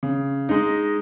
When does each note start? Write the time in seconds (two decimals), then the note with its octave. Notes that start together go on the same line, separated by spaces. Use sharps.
0.03 C#3
0.49 G#3 D#4